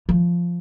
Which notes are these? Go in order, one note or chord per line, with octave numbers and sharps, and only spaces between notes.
F3